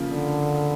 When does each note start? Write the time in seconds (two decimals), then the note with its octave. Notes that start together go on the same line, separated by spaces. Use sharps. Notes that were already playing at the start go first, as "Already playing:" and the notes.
Already playing: C#3 F3 A#3
0.11 D3